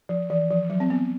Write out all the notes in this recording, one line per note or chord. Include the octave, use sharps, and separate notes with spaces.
F3
E3
F3
F#3
C4
B3